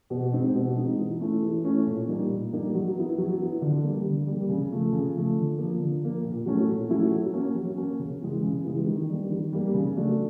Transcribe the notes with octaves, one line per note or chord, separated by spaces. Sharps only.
B2
G#3 C4 D#4
B2
G#3 C4 D#4
E3
A3 C#4 E4
E3
A3 C#4 E4
A#2
G3 A#3 D#4
A#2
G3 A#3 D#4
F#3
B3 E4
F#3
B3 E4
D3
G3 A#3
D3
G3 A#3
C#3
F3 A3
C#3
F3 A3
D3
F3 A#3
D3
F3 A#3
A#2
F#3 A3 C#4 E4
A#2
F#3 A3 C#4 E4
F#3
A#3 C#4
F#3
A#3 C#4
C#3
E3 G#3
C#3
E3 G#3
D#3
G3 A#3
D#3
G3 A#3
C#3
F#3 A3 D4